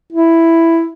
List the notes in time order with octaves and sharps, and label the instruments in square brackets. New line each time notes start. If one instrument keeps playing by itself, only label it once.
[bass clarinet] E4